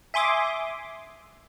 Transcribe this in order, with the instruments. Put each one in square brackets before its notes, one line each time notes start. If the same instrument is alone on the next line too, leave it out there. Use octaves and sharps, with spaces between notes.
[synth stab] E5 G#5 C6 D6 D#6